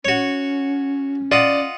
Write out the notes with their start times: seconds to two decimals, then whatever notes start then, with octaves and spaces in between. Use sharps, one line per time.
0.05 C#4 F#4 C#5
1.32 F4 D5 D#5 F#5